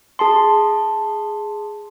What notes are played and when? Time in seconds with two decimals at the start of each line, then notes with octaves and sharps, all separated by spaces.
0.19 G#4 A5 C6